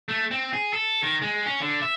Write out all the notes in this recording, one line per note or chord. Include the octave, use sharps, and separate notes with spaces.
A3
C4
G#4
A4
D#3
G#3
C#4
D3
E5